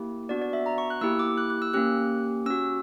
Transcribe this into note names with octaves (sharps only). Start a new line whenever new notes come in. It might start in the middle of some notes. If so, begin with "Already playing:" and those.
Already playing: A#3 E4 G4
B3 D4 F#4 D5
D5
E5
A#5
C#6
F#6
A#3 E4 G4 E6
D6
F#6
F#6
E6
A#3 C#4 G4 F#6
C#4 F#4 E6